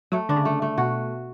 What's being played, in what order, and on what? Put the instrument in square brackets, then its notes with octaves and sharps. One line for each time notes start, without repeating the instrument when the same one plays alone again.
[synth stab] F#3 [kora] A3
[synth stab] D3 [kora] D4
[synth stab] C#3
[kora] A3
A3
[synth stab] B2 [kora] F#4